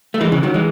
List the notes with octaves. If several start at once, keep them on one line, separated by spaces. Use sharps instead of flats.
A3
E3 G#3
C#3 E3
D#3 F#3
E3 G#3